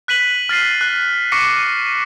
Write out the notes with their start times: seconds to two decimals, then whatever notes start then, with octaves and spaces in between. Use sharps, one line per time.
0.08 F#6 B6 D#7 F#7
0.49 F6 A6 B6 C7 D#7
0.81 F#6
1.32 C#6 D6 A#6 C7 C#7